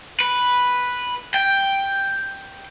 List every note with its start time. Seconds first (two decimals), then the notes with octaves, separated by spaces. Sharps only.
0.20 B4
1.34 G5